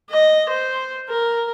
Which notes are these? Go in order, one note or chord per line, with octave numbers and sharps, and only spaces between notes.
D#5
C5
A#4